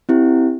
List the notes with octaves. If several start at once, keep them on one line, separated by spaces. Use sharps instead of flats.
C4 E4 G4